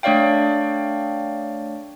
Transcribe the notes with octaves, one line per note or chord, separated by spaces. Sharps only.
A3 D4 C#5 D5 F5 G5